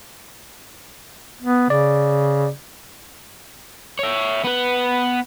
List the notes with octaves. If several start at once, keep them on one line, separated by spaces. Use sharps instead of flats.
B3
C#3 D5
C#5 E5
B3 B4